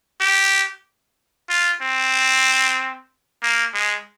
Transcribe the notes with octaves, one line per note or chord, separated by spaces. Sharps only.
G4
F4
C4
A#3
G#3